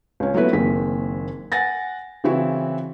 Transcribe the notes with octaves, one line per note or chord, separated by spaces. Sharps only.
C#2 C#4
F#3 A3 B3 E4 B4
F#1 D#3 A#3 C4 G#4 B6
F#5 G#5 A6 A#6
C#3 E3 C4 E4 F#4